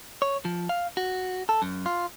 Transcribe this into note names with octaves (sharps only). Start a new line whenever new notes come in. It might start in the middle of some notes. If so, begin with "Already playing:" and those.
C#5
F3
F5
F#4
A4
F#2
F4